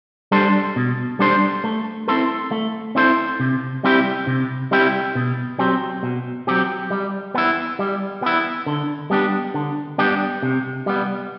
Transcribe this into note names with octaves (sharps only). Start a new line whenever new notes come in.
G3 D4 A4 C5
B2
G3 D4 A4 C5
A3
C4 E4 A4 C5
A3
C4 E4 A4 C5
C3
G3 C4 E4 G4
C3
G3 C4 E4 G4
B2
F#3 C4 G4
B2
F#3 C4 G4
G3
B3 E4
G3
B3 E4
D3
G3 B3 D4 G4
D3
G3 B3 D4 G4
C3
G3 B3